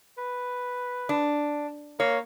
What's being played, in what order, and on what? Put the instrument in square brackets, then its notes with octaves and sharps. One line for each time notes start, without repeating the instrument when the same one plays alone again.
[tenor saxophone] B4
[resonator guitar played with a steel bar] D4
[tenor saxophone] A#3 [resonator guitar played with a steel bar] C#5